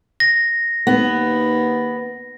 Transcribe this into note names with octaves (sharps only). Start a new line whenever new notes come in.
A#6
D#2 B3